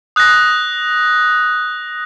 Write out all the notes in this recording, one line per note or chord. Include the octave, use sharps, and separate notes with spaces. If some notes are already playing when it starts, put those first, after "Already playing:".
D#6 F#6 A#6